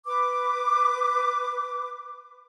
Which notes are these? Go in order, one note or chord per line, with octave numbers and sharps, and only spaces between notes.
B4 D6